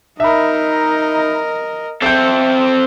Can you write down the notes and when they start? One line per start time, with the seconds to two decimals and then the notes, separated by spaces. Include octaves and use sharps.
0.20 D#4 A#4 D#5 E5 B5
2.02 C4 A4 E5 G6 C7